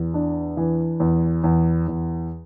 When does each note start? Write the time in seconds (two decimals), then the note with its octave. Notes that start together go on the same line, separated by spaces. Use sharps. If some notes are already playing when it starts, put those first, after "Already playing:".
Already playing: E2
0.14 D4
0.57 E3
1.00 E2
1.44 E2
1.88 E2